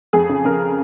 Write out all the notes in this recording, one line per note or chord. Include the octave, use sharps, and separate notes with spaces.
F2 G#4
C#3
C#3 A#4